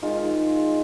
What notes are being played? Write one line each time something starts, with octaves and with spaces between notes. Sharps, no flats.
D#3 G#3 D#4 F4